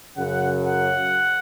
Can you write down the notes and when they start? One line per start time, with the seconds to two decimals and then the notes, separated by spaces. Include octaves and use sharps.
0.17 F#2 C#3 F#3 F#5
0.64 F#5